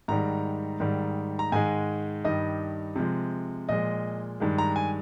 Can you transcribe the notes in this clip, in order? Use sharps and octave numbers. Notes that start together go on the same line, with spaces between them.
G#2 D#3 G3 A#5
G#2 D#3 G3
A#5
G#2 D#3 G#3 G#5
G2 D#3 G3 D#5
C3 F3 G#3
A#2 F3 G#3 D#5
G2 D#3 G#3
A#5
G#5